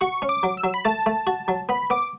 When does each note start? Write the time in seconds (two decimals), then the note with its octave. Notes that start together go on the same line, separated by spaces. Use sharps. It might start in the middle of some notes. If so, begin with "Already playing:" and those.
0.01 F#4 C#6
0.22 C#4
0.29 D6
0.43 F#3
0.57 E6
0.64 F#3
0.74 B5
0.85 A3 A5
1.06 A3
1.27 F#4
1.48 F#3
1.69 B3 B5
1.90 B3 D6